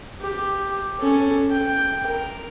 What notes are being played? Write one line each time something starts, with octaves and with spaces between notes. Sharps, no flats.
G4
C#4 A4
G5
A#4